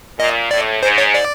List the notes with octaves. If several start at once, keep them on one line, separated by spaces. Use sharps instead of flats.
A#2 D#5
A2 D5
G#2 C5
C#5
D5